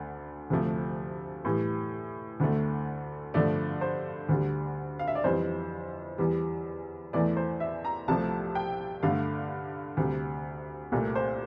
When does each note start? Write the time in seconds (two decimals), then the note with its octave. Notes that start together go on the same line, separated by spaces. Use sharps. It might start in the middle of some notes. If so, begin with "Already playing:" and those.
Already playing: D2 D3 A3
0.50 D2 C3 F3 A3
1.45 A2 E3 G3
2.40 D2 D3 A3
3.34 G2 D3 F3 A3 D5
3.81 C5
4.29 D2 D3 G3
4.99 F5
5.08 E5
5.15 D5
5.24 F2 E3 G3 C5
6.18 E2 E3 G3
7.13 E2 E3 A3 D5
7.37 C5
7.60 E5
7.85 A#5
8.08 C2 C3 F3 A3 A5
8.55 G5
9.03 G2 D3 A3 F5
9.97 D2 C3 G3
10.92 C2 A#2 A3
11.15 C5